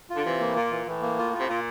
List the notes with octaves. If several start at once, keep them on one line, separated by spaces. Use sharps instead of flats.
F4
D3
C3 E3
A#3
A2
A#2 F4
E3
A2 E3
A#3
F4
C3 F4
A#2 F4